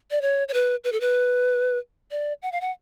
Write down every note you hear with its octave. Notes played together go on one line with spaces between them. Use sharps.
D5
C#5
C#5
B4
B4
A4
B4
D5
F#5
F5
F#5